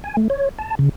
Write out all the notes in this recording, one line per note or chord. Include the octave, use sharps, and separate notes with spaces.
G#5
A3
C#5
A5
C#3